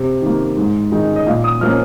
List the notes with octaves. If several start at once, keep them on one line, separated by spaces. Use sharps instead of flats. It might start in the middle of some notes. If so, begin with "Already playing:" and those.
Already playing: C3
D#3 A#3
G#2
D#3 G#3 D#4
D#5
A#2 F5
D#6
F3 A#3 C#4 F6